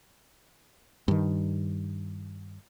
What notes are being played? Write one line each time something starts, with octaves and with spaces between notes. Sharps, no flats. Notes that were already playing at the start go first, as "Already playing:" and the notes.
G2 D#3